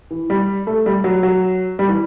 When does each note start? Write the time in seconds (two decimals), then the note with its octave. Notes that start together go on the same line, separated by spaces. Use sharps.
0.11 E3
0.30 G3
0.67 A3
0.86 G3
1.04 F#3
1.23 F#3
1.79 G3
1.89 E3